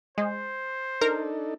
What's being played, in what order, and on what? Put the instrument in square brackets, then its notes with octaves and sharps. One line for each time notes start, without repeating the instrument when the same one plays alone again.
[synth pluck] G#3 [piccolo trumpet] C5
[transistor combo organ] D4 D#4 A4 [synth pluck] A#4